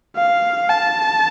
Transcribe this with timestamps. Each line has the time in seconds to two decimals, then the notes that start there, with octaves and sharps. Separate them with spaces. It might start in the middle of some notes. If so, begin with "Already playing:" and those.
0.17 F5
0.69 A5